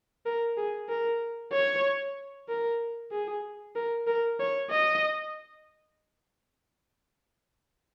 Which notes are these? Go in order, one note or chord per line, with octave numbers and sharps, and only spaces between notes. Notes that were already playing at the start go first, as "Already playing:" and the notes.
A#4
G#4
A#4
C#5
A#4
G#4
A#4
A#4
C#5
D#5